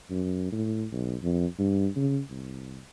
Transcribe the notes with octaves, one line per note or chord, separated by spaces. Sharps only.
F#2
A2
B1
F2
G2
C#3
C2